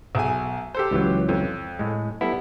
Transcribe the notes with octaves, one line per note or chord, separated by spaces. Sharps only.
B1 G#4 E5 G#5
G4 A4 C5
C#2 E3 F#3
F2
A2 G#3
G3 B3 E4 A4 E5